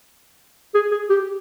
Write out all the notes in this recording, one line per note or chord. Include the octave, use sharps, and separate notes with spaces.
G#4
G#4
G4